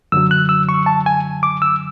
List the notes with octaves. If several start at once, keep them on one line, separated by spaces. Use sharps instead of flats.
F#2 D3 F#3 E6
F#6
E6
C#6
A5
G#5
D6
E6